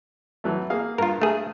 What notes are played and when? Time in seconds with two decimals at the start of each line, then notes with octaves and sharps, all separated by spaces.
0.44 E3 F#3 A3
0.70 A#3 G#4 F5
0.98 G2 F4 A#4
1.22 A3 G#4